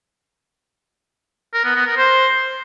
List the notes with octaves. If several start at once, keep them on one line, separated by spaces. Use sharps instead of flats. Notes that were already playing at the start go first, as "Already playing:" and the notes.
A#4
B3
B3
A#4
C5